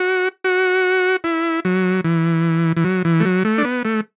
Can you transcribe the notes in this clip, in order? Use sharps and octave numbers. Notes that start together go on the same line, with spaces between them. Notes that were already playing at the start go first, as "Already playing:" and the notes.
Already playing: F#4
F#4
E4
F#3
E3
E3
F#3
E3
A3
F#3
A3
D4
B3
A3